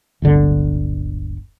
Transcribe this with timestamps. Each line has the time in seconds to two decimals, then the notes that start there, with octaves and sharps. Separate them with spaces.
0.22 D1 G1 D3